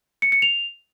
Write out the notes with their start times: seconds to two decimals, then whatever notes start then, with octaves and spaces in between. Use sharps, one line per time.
0.22 C#7
0.32 C#7
0.42 F7